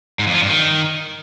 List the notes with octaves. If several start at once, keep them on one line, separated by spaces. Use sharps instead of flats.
G#2
F2
F3
G2
D#3